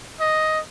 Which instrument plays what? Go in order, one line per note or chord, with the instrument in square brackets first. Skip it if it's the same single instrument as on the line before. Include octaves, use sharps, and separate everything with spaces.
[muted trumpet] D#5